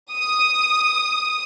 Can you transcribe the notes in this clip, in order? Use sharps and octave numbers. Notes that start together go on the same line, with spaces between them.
D#6